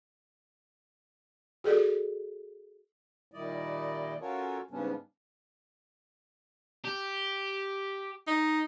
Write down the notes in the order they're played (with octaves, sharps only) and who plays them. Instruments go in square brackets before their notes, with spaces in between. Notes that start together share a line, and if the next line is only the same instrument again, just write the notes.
[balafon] F#4 G#4 A4 D5
[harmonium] A#2 D#3 G3 E4 D5 D#5
C#4 F4 F#4 A4 A#4 C#5
G#2 C#3 G3 B3 C#4 D4
[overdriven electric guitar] G4
[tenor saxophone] D#4